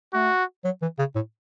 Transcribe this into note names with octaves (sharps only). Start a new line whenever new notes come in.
A3 F#4
F#3
E3
C#3
A2